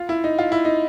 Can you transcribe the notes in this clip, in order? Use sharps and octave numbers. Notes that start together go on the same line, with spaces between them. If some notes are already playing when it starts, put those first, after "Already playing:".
Already playing: F4
E4
D#4
F4
E4
D#4